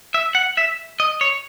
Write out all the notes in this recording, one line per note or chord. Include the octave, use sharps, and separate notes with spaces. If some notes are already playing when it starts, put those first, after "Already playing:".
E5
F#5
E5
D#5
C#5